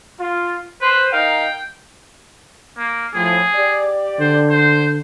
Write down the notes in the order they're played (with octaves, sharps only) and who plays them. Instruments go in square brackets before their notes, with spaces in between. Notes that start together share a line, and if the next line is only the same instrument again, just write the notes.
[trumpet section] F4
[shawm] B4 [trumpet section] C5
[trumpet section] D#4 A#4 F5 [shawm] G5
[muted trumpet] A#3
[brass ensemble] A2 F3 [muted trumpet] G#4
[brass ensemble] G4 D5
[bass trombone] D3 [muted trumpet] C5
[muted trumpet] C5